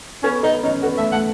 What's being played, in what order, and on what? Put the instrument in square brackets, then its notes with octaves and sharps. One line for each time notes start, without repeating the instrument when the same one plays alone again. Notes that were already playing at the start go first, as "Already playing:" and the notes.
[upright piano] B3 [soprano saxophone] C#4
[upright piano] B3 [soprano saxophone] D#4
[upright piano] C#4 [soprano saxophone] D#4
[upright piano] B3 [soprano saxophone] F#4
[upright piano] A3 [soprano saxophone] E5
[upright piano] A3 [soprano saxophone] F#5